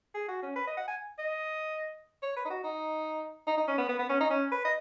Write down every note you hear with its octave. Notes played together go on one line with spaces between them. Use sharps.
G#4
F#4
C#4
B4
D#5
F#5
G#5
D#5
C#5
B4
D#4
F#4
D#4
D#4
D#4
C#4
B3
B3
B3
C#4
D#4
C#4
B4
D#5